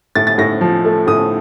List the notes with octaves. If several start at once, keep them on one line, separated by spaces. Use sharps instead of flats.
A2 A6
A6
A2 A#6
F3
A3
A2 D#6